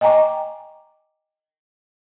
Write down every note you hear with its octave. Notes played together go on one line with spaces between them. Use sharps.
D#5 G5 G#5 A#5 C#6 D6